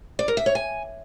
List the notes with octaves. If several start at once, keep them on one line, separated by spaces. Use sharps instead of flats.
D5
A#4
E5
C#5
G#5